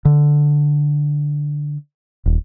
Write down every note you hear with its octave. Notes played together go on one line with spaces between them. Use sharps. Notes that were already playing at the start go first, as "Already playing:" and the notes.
D3
D#1